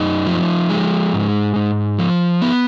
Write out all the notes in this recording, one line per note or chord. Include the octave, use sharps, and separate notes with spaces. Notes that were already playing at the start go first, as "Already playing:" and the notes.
Already playing: F#2 D#4
F3
G#3
G#2
G#2
F3
B3